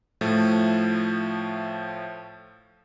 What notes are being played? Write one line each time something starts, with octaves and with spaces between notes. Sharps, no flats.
A2 F3 A3